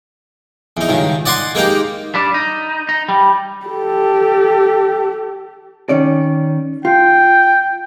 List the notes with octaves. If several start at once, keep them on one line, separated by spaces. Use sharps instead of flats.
E2 D#4
C#2 G2 D#3
D5 D#5 F#5 G#5 C6
G#3 A#3 D#4 G4
G3 D4
D#4
D#4
G3
G4 A4
D#3 C#4 D5
F4 G5